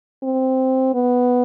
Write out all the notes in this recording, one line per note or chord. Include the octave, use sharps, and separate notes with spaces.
C4
B3